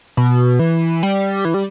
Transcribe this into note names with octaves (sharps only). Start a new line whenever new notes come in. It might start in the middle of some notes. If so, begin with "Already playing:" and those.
B2
E3
G3
E3
G3